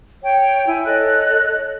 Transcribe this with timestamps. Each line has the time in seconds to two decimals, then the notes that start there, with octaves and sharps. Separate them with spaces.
0.22 C#5 G5
0.66 E4 G#5
0.86 A4 C#5 D#5 F#6